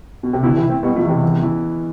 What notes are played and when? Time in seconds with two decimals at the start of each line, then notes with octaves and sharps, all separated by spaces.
0.23 B2
0.33 C3
0.43 B2 D3 E4
0.56 C3 E3
0.63 E4
0.69 A3 C4
0.83 B2 G3 B3
0.96 F3 A3
1.03 E2
1.09 C3
1.23 E3
1.43 E3